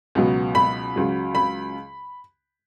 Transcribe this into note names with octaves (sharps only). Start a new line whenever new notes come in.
C#2 B2 F#3
B5
C#2 C#3 F#3
B5